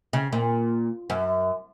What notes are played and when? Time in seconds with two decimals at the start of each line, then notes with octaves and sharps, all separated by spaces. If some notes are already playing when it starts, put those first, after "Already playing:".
0.13 C#3
0.33 A#2
1.10 F#2